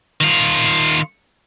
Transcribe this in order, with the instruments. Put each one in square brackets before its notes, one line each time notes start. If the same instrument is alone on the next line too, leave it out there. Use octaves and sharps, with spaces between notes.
[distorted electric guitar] D#3 F4